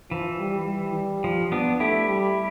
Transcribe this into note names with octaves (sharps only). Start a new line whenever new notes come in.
E3 F3
G3
G3
F3
B3 D4
A3 E4 G4
G3